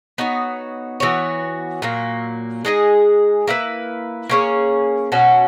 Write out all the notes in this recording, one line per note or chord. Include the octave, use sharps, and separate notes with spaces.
B3 D#4 F#4 C#5
E3 B3 F#4 C#5
A#2 F#3 A#3
G#3 D#4 G#4 D#5
A#3 E4 B4
A#3 C#4 G#4 C#5
B2 F#3 C#4 F#4